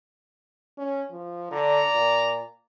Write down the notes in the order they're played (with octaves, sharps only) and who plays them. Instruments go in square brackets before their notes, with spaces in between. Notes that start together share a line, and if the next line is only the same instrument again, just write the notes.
[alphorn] C#4
F3
[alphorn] D3 [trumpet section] D5 A#5
[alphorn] A#2